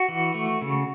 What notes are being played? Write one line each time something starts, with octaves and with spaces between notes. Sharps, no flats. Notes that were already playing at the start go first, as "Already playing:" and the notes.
Already playing: F#4
E3
A3
C#3